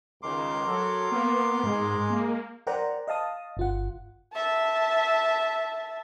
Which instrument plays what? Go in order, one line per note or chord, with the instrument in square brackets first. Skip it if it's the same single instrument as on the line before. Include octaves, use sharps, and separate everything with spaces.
[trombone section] C#2 D#3 [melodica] A#4 C6 D6
[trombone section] F#3 A4
[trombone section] A#3 [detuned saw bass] B3
[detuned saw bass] G#2 [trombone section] G#3
[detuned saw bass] A#3
[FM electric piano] A#4 C5 D5 F#5 G5 A#5
D#5 F5 A5 D#6
G1 F4 F#5
[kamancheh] E5 A5